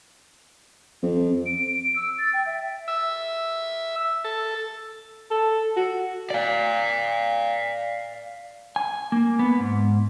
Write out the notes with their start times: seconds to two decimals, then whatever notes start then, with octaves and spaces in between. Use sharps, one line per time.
1.02 F2
1.46 D7
1.58 D7
1.96 E6
2.18 A6
2.34 G5
2.46 E5
2.88 E5
4.24 A4
5.31 A4
5.77 F#4
6.30 D5 F5
8.76 G#5
9.12 A#3
9.39 B3
9.60 G#2